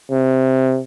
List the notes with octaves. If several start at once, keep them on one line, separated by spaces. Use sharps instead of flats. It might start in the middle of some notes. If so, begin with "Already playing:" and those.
C3